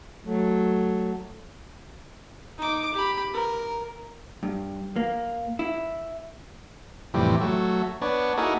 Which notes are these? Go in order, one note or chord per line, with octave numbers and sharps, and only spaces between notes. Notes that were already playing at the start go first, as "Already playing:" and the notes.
F#3 A3
D#4 D6
G4 B5
A#4
G2
A#3
E4
F2 A2 C3 E3 G3
F#3 A3
B3 D4 C#5
A#3 D#4 E4 F#4 G#4 A4